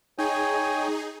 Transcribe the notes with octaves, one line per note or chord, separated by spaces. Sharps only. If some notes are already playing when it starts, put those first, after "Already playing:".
D#4 G#4 C#5 G5 G#5